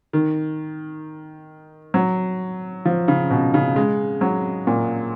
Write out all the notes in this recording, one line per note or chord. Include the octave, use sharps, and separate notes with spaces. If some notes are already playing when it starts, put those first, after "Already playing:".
D#3
F#3
F3
C#3
B2
C#3
G#3
F#3
A#2